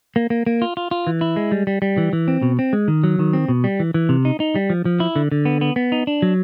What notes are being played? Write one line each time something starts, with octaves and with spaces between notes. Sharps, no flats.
A#3
A#3
A#3
F4
F4
F4
E3
E4
G#3
G3
G3
G3
E3
E3
C4
B2
C4
G#3
D#3
F#3
D#3
C4
B2
G3
E3
E3
C3
D#4
D#4
G3
F3
F3
E4
D3
D3
B3
B3
B3
D#4
D4
F#3